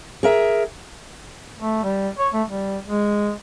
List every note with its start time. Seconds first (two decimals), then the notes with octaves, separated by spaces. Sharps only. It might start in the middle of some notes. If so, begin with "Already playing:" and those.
0.23 G#4 A#4 E5
1.59 A3
1.83 G3
2.18 C#5
2.33 A3
2.48 G3
2.87 G#3